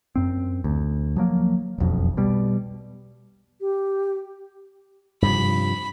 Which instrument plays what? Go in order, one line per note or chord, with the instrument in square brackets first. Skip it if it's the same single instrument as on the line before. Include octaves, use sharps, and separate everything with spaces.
[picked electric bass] F#2 C4
D2
F3 F#3 A#3
E1 B1 F2
B2 G3
[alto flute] G4
[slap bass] G2 C3 F3 [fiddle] B5